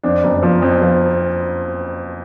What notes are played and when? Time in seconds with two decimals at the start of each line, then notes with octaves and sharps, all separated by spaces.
0.03 F2 D4
0.24 F#1
0.43 F3
0.62 F2
0.82 F3